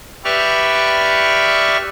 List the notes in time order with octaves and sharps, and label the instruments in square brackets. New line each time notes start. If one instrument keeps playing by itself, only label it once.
[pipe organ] G4 B4 D5 E5 C#6 F6